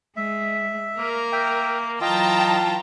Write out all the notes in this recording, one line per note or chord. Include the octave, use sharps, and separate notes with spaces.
G#3 E5
A#3 A#4
E5 G5
E3 F#3 F4 D#5 G5 A5 A#5